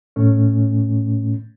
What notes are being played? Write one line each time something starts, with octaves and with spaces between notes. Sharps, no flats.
A2 A3 C#4